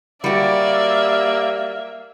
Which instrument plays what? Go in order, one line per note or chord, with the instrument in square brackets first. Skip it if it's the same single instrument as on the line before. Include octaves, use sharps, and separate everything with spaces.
[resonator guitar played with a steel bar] G3 F#4 [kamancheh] A#3 E5 [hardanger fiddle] D5